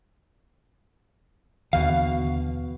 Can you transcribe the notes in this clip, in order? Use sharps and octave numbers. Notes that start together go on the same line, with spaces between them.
D#2 B2 D3 E3 F5